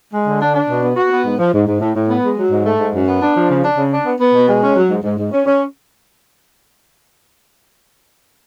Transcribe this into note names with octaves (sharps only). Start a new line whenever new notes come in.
G#3
D3
D4
D4
B2
B3
F#4
B3
G#2
F3
G#2
G#2
A2
A2
B3
G#3
F#3
G#2
A3
G#2
F#2
B3
D4
F3
C#3
D4
C#3
D4
B3
B3
B2
G#3
C#4
F#3
G#2
G#2
G#2
C#4
C#4